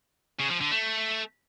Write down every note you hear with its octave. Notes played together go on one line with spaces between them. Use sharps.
C#3
F3
D3
A3